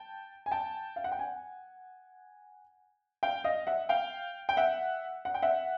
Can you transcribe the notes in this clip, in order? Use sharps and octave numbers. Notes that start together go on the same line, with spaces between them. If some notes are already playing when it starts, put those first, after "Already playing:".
Already playing: G5 A5
G#5
G5 A5
F5
F#5
G5
F#5 G#5
F5 G5
D#5 F5
E5 F#5
F5 G5
G5
E5 F#5
F#5
G5
E5 F#5